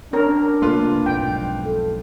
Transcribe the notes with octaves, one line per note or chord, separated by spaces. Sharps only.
C#4 D4 A#4
C2 A3 A#3 F4 B4 C6
B1 F2 G#2 G5
A4